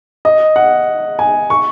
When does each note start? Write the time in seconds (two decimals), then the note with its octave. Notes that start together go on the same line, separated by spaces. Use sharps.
0.25 D#5
0.56 F#5
1.19 G#5
1.50 C#6